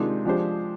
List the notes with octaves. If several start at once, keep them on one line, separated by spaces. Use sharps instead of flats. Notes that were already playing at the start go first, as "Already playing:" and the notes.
Already playing: C3 D#3 G#3 D4 F4
F3 G#3 D4 G4 C5